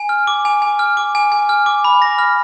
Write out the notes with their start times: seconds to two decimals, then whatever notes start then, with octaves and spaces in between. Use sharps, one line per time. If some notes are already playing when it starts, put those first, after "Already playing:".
Already playing: G#5
0.09 F6
0.27 D6
0.45 G#5
0.62 G#5
0.79 F6
0.97 D6
1.15 G#5
1.32 G#5
1.49 F6
1.66 D6
1.84 B5
2.02 A#6
2.19 F6